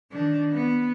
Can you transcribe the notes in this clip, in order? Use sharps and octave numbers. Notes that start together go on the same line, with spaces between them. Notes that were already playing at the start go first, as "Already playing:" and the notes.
D#3 D4
B3